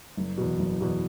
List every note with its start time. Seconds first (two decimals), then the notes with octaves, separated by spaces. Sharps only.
0.17 F#1
0.37 E2 B2
0.59 F#1
0.81 E2 B2